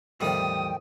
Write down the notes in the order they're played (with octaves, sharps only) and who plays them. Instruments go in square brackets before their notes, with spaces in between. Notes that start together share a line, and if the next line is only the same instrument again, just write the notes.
[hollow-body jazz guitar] E2 G3 [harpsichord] A2 D#3 F3 [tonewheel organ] G5 [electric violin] D#6